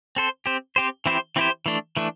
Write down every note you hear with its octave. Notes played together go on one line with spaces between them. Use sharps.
C4 A4 C5
C4 G4 C5
C4 G4 C5
E3 C4 E4 G4 C5
E3 C4 E4 G4 C5
E3 A3 D4
E3 A3 D4